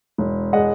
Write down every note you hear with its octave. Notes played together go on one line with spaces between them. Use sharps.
E1
G#3 D#5 F#5